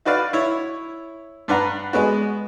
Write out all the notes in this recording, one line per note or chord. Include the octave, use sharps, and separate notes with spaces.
D#4 F#4 B4 D5 F5
E4 C#5
G2 D4 B4 F#5 A#5
G#3 B3 F#4